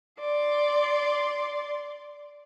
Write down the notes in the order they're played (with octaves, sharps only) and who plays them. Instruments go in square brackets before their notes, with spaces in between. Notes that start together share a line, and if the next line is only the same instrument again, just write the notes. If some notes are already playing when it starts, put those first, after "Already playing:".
[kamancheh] D5 C6